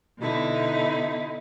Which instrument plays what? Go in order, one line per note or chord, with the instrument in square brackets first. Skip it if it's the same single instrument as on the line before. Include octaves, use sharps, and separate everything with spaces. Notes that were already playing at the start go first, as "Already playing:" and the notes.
[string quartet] B2 D3 D#4 E4